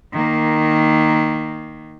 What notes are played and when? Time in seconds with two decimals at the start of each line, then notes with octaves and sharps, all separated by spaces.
0.13 D#3 A#3